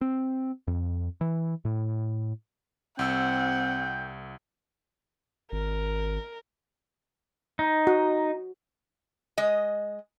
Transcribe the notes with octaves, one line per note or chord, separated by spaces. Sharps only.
C4
F2
E3
A2
C2 C4 F#5 G5 E6
G#1 A#4
D#4
F#4
G#3 D#5